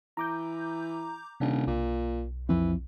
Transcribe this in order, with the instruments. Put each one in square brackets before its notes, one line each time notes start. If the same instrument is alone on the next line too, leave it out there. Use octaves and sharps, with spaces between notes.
[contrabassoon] E3 [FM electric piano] A#5 D6 G6
[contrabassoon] D#1 [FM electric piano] C3 D4
[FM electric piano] B1 [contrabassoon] A#2
[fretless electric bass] F2 F3 C4 [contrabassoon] E3